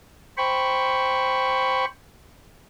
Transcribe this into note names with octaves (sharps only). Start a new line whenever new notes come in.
C5 G5 B5 C#6